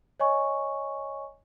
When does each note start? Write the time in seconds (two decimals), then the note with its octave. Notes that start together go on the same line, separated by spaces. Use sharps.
0.20 C#5 D#5 G#5 C#6